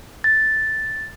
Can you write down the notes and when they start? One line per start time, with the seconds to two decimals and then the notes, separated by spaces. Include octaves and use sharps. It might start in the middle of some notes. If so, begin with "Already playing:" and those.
0.24 A6